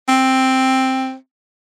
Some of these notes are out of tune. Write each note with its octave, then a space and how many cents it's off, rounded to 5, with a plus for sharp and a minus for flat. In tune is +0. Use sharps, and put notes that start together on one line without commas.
C4 +5